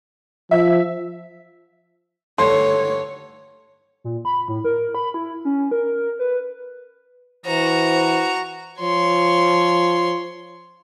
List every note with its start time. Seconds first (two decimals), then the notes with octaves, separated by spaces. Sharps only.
0.51 F3 E5
2.38 D2 G2 A3 C#5 C6
4.04 A#2
4.25 B5
4.48 A2
4.64 A#4
4.95 B5
5.14 E4
5.45 C#4
5.71 A#4
6.19 B4
7.46 E3 F#4 C5 A#5
8.81 F3 C#5 C6